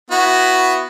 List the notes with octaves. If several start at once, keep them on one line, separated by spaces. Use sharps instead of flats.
B3 E4 F#4